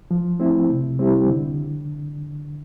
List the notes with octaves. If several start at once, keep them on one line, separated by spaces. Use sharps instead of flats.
F3
A3 C4 E4
C3
G3 C4 E4 G4
D3